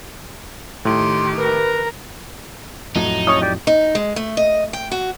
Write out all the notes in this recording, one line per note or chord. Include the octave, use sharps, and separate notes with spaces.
A2 D#3 G4 C6
A#4 B4 A#5
F2 A2 F#3 D#4
F3 C#4 C#5 D#6
D#4 G4 D5
D#4
G#3
A3
D#5
G5
F#4